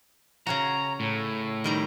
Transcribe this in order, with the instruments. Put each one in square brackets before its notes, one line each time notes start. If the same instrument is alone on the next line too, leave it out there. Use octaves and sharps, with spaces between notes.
[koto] C#3 C#4 F#4 [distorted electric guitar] A#5
[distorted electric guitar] A2
[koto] D#3 G3 A#5